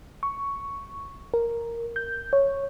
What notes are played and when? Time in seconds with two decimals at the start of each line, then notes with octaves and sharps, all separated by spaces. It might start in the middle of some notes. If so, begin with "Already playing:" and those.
0.23 C#6
1.34 A#4
1.96 G6
2.33 C#5